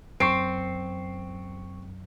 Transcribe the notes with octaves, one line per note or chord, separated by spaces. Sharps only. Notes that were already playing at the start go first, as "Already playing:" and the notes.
F#2 C4 C#6 C7 D7